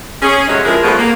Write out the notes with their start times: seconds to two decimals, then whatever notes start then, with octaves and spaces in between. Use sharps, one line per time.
0.22 C#4 G#4
0.48 C3 F#3 G#3 A3 C#4
0.65 F3 G#3 E4 G#4 A#4
0.84 F2 B2 F3 G3 A3 G#4
0.97 A#3